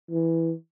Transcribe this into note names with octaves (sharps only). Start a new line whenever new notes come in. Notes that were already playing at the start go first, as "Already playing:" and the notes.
E3